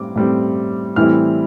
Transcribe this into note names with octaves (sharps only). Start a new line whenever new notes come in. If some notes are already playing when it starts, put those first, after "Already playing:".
Already playing: A2 G3 C4 D6
A2 G3 C4
A2 E3 G3 C4 E4 F6